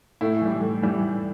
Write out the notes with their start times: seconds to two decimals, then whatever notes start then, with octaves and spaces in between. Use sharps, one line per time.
0.21 A2 E4
0.41 E3 G3
0.61 A2
0.82 E3 G3